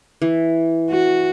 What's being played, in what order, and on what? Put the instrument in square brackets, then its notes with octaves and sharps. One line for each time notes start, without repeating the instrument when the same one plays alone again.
[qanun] E3
[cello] F#4